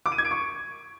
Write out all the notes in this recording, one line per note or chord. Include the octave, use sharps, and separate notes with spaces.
D6
D#7
G#6
D7
C#6